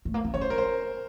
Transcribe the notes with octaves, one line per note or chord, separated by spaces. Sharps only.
A3
A#3
C4
C#4 C#5
C5
A#4
C5